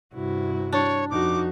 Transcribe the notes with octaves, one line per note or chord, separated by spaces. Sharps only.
G2 C3 E4 F#4
D4 C#5
F2 D#4 F#4 D6